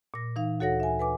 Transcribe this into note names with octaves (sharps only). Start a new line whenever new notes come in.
A#2 A#6
E3 D#4 F5
D2 F#4 A4 C#5 F#5 A#6
E5 G#5
B4 G#5 D6